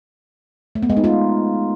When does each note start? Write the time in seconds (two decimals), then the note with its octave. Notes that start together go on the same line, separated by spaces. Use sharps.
0.75 A3
0.83 B3
0.90 G#3
0.97 D#4
1.04 F4